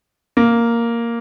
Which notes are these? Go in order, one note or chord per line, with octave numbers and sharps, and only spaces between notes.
A#3